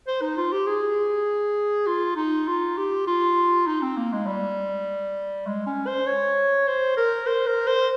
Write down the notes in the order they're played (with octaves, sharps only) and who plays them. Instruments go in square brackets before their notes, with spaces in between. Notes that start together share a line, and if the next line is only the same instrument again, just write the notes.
[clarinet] C5
D#4
F4
G4
G#4
F4
D#4
F4
G4
F4
D#4
C4
A#3
G#3
G3
G#3
C#4
C5
C#5
C5
A#4
C5
A#4
C5